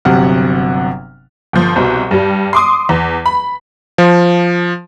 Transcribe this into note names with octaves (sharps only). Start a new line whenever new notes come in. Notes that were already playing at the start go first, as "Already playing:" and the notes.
G1 C3 F#3 F#5 F6
G1 F3
C2 B2 C5
G2 G3
C6 D6 D#6
E2
B5
F3